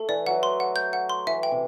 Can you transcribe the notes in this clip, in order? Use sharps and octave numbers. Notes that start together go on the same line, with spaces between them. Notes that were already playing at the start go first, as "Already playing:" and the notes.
Already playing: A3 A4
E3 D5
F#3 F#5
C6
F#5
G6
F#5
C6
E3 E5
G5
C3